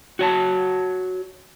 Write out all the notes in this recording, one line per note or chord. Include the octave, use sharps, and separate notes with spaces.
F#4 C#5 A5